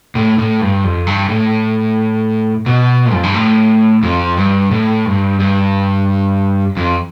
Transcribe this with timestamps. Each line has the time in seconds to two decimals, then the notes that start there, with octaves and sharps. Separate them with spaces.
0.15 A2
0.38 A2
0.61 G2
0.84 F2
1.07 G2
1.29 A2
2.66 B2
3.12 F2
3.23 G2
3.34 A2
4.03 F2
4.37 G2
4.71 A2
5.06 G2
5.40 G2
6.77 F2